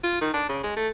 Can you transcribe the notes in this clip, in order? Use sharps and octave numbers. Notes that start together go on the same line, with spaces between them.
F4
D#3
D4
C#3
G#3
A3